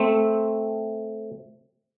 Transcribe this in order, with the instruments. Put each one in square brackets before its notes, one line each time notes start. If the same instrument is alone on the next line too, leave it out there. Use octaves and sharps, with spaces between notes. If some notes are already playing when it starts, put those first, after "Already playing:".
Already playing: [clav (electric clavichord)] A3 C4